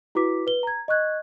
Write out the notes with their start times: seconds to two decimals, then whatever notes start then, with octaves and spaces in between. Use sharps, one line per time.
0.15 E4 F#4 B4 D6 B6
0.47 B4 G7
0.63 A#5 G#6
0.88 D#5 C#6 F#6 G#6